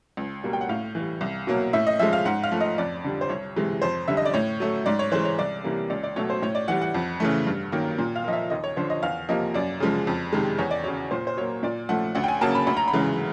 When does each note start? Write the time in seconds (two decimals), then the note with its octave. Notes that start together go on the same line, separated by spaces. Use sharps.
0.17 C#2
0.44 B2 G3 A#3
0.53 G5
0.61 F#5
0.69 A2 F5
0.95 E3 G3
1.21 C2
1.47 B2 F#3 A#3
1.73 A2 E5
1.87 D#5
1.99 F3 G#3 E5
2.13 F5
2.25 G#2 F#5
2.43 F5
2.52 F3 A3
2.60 D#5
2.78 F2 D5
3.04 D3 G3
3.21 C5
3.29 C2 C#5
3.56 C3 E3 G#3
3.82 F2 C5
4.08 D3 G3 E5
4.17 D#5
4.25 D5
4.34 A2 C#5
4.60 F#3 A3
4.86 G#2 D5
4.99 C#5
5.11 E3 G#3 C5
5.25 C#5
5.38 C2 D5
5.64 C3 E3 G3 A#3
5.90 C#2 D5
6.03 D5
6.16 B2 F#3 A3 C#5
6.30 C5
6.42 A2 C#5
6.55 D5
6.68 E3 G3 F#5
6.81 F#5
6.94 F2
7.20 C#3 E3 A3
7.47 G2
7.72 D#3 F#3 A#3
7.98 A#2
8.16 F5
8.24 F3 A#3 D#5
8.33 E5
8.50 D#2 D#5
8.64 C#5
8.77 D3 F3 C5
8.90 D#5
9.03 E2 F5
9.29 C3 F3 A#3 D#5
9.54 F#2 D5
9.80 C#3 F3 G#3
10.07 F2
10.33 C3 D#3 G#3
10.58 E2 C#5
10.71 D5
10.84 C#3 F#3 C#5
11.11 A#2 C5
11.27 C5
11.37 F#3 A#3 C#5
11.63 A#2 D5
11.89 F3 A3 F#5
12.15 D2 F#5
12.24 G5
12.28 G#5
12.41 C#3 F#3 A#3 A5
12.55 B5
12.67 D2 B5
12.77 A#5
12.88 B5
12.93 C#3 E3 G#3